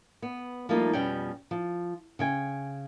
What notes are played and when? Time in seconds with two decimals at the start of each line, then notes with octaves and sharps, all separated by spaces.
0.22 B3
0.69 F3 G3 A3 A#3 D#4 F4
0.93 F2 B2 G3 C#4 G5
1.51 F3
2.19 C#3 G5 G#5